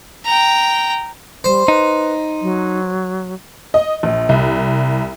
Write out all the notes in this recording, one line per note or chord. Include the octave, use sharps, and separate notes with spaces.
G5 A#5
G3 C5
D#4 B4
F#3
D#5
A#1
C2